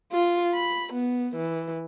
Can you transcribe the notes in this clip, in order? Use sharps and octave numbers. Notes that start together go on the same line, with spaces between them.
F4
B5
B3
E3